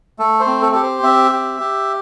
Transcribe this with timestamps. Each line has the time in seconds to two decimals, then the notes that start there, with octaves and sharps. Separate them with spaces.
0.19 A3 A4
0.40 C5
0.47 C4
0.62 A4
0.72 G4 A4
0.83 C5
1.03 C4 E5
1.32 G4
1.61 G4